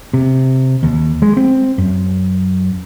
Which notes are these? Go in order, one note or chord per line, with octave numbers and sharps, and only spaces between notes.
C3
D#2
G#3
C4
F#2